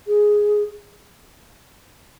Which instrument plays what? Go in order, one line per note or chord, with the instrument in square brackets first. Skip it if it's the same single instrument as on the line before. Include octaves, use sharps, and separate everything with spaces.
[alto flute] G#4